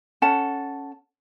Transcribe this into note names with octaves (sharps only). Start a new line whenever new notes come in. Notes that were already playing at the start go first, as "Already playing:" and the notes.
C#4 A4 F#5 A5